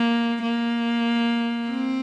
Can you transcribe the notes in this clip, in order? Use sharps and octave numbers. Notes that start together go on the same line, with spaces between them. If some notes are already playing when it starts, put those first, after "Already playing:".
Already playing: A#3
A#3
C4